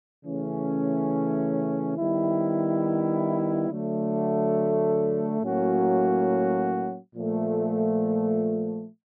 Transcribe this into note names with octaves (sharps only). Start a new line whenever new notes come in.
C#3 E3 A3 C#4
D#3 G3 B3 E4
D3 F#3 A3
A2 F#3 A#3 C#4 F#4
A#2 F3 A3